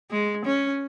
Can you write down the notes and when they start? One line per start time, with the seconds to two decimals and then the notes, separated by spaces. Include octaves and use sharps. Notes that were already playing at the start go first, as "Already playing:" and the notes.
0.11 G#3
0.46 C#4